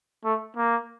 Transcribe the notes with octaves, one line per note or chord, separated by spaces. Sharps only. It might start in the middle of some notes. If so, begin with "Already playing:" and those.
A3
A#3